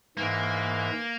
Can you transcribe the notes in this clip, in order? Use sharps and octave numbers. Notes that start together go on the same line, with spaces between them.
G#2 E3 A#3